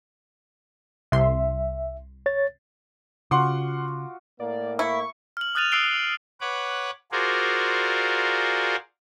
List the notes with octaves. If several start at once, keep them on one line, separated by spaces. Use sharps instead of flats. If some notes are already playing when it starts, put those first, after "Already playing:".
C2 E5 C6
C#5 A6
C#3 F4 F#4 F#5 C6 D6
A2 A#3 D5
E4 C#6
F6 F#7
D#6 F6 F#6 A6 D#7 F7
D#6 E6 F#6 C7 D7 G7
B4 C#5 F#5 D6
F4 F#4 G#4 A#4 C5 D5